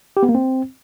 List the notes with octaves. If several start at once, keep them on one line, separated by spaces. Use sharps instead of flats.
G4
B3
A#3
C4